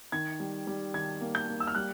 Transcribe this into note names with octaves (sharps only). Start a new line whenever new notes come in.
D#3 G#6
G3
G3
D#3 G#6
A#3
G6
A#3
E6
F6
G3 F#6